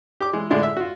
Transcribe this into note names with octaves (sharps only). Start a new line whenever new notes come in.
G4 D6
E3 G#3
A2 D3 G#3 D4 E4 F4
E5
F4 F#4